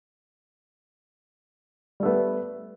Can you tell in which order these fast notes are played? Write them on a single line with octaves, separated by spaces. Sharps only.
G3 A3 B3